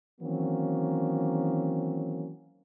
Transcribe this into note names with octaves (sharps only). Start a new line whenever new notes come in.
D#3 E3 F#3 A#3 C4 C#4